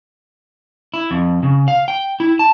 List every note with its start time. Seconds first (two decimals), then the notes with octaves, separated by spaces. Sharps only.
0.94 E4
1.11 F2
1.43 C#3
1.68 F5
1.88 G5
2.20 E4
2.39 A5